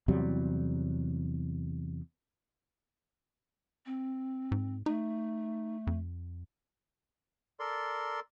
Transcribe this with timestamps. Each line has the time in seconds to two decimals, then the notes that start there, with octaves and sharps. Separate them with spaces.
0.08 E2 C3 F#3 G3
3.86 C4
4.52 G#2
4.86 A3 D#4
5.87 F2
7.60 A4 A#4 D5 C6